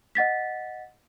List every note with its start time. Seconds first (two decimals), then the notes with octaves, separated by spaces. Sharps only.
0.15 D#5 F#5 A6 B6